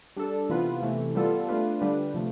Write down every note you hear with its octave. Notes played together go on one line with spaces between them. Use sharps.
G3 D4 A4
C3 E3 B3 F4 B4
C3 E3 A3
G3 B3 F4 A4
A3 D4 F4 B4
D3 G3 D4 G4 B4
C3 F3 A3